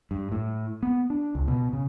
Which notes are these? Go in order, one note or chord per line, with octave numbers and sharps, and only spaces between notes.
G2
A2
B3
D4
C#2
B2
C#3